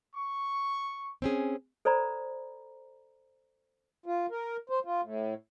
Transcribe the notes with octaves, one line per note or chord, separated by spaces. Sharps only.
C#6
C4 C#4 G#4
A4 C5 D5 A#5 B5
F4
A#4
C5
F4
A2